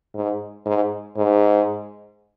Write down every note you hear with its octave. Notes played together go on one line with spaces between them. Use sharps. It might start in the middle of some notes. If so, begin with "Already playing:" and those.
G#2
G#2
G#2